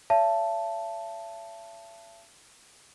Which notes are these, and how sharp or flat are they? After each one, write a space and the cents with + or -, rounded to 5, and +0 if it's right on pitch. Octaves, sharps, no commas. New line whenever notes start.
C#5 +45 E5 +40 A5 +0